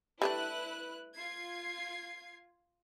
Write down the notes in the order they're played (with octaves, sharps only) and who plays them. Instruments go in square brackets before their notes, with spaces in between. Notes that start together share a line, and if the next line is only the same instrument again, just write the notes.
[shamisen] G3 A3 D4 [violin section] E4 B4 F#6
[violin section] F4 G#6 C7